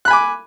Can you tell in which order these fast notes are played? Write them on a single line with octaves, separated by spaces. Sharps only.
F#6 B5 G#5 D6